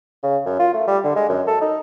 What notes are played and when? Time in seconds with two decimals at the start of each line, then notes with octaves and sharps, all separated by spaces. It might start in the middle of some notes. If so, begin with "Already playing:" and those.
0.23 C#3
0.46 F#2
0.59 F4
0.73 A3
0.87 G3
1.04 D3
1.16 G#3
1.29 F#2
1.48 A4
1.61 D#4